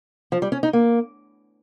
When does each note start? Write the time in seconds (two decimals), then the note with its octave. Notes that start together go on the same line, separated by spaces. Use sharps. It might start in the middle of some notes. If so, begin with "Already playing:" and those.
0.32 F3
0.42 G3
0.52 C#4
0.63 D#4
0.73 A#3